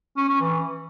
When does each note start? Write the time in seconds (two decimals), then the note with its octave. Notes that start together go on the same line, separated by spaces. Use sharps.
0.17 C#4
0.29 C#4
0.41 E3